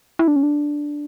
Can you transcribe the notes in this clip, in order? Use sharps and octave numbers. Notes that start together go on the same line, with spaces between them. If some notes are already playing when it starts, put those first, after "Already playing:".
E4
D4
C#4
D4